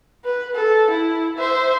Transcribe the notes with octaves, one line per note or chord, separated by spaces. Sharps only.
B4
A4
E4
C5 E5